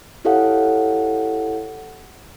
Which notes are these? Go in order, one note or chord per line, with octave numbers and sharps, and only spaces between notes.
E4 G4 A4 C#5 F5 F#5